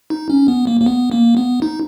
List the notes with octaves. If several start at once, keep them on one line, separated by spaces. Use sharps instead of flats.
D#4
C#4
B3
A#3
A#3
B3
A#3
B3
D#4